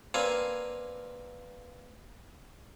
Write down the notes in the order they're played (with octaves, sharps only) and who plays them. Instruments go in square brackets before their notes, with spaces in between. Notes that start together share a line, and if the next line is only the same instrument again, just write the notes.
[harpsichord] A#3 C4 D4 B4 F5 G#5